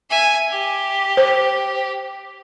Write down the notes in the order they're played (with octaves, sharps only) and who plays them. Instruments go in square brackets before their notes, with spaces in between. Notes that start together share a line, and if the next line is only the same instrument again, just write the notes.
[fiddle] E5 G#5
G4
[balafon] C5